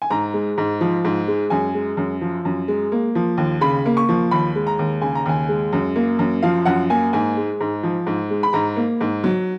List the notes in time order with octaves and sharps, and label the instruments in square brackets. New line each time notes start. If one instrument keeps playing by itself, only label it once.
[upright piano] G#5
G#2 A#5
G#3
G#2
F3
G#2
G#3
F#2 G#5
G#3
F#2
F3
F#2
G#3
A#3
F3
D#2
C#3 B5
A#3
C#6
F3
D#2 B5
G#3
A#5
D#2
C#3 G#5
A#5
D#2 G#5
G#3
F#2
A#3
F#2
F3 F5
F#2 F#5
A#3 G#5
G#2 G#5
G#3
G#2
F3
G#2
G#3
B5
G#2 A#5
A#3
G#2
F#3